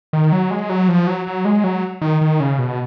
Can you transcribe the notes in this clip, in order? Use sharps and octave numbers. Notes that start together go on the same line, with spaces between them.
D#3
F#3
G#3
F#3
F3
F#3
F#3
G#3
F#3
D#3
D#3
C#3
B2